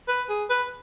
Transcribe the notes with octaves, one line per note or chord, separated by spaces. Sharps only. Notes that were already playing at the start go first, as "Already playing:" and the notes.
B4
G#4
B4